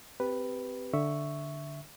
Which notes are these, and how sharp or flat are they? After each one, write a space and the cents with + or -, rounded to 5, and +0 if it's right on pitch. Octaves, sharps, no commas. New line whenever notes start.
C4 -15 G4 +0 B4 +0
D3 +0 E5 +0 C#6 +0